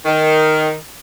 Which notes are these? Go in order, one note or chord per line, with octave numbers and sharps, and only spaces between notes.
D#3